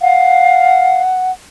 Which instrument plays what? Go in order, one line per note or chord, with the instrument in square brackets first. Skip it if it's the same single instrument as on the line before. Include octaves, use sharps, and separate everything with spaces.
[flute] F5 [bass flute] F#5